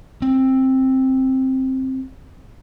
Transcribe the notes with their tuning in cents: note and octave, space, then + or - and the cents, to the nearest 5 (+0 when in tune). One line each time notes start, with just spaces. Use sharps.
C4 +10